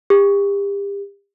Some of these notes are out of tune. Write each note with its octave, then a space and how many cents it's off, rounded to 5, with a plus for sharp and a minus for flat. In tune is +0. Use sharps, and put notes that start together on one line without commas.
G4 +35